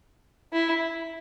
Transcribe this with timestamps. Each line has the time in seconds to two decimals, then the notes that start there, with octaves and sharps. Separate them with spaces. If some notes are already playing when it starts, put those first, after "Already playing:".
0.52 E4